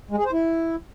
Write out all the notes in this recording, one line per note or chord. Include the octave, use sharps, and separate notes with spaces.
G#3
G#4
C5
E4